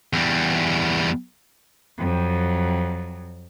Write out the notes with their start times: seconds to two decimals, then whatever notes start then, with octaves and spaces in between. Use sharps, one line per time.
0.13 E2 G3
1.98 F2 F#3